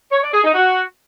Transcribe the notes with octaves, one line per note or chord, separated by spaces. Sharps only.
C#5
D5
G#4
D#4
F#4